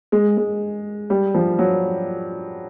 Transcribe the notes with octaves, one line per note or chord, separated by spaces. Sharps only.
G#3
G#3
G3
F3
F#3